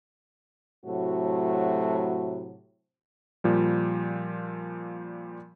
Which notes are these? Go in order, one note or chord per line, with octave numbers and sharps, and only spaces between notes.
A2 C3 F#3 A3 F#4
A#2 F3 G3